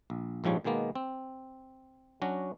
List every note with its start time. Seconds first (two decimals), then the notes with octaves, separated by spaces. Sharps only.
0.10 A#1
0.44 A#1 G#2 F3 G3 C#5
0.64 B2 D#3 G#3 A#3 B3
0.95 C4
2.22 F#3 C#4 D4 F#4